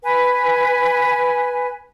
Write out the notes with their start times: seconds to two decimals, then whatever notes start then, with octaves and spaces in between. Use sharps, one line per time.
0.04 B4 G#5